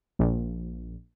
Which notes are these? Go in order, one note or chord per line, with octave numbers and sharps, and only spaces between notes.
A#1